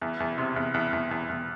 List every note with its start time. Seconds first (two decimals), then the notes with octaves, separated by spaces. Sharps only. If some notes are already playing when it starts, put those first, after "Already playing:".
0.01 E2
0.20 E2
0.38 C3
0.56 E2
0.74 E2
0.93 E2
1.11 E2
1.29 E2